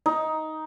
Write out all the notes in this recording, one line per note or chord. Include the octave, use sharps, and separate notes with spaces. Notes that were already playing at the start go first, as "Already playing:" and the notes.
D#4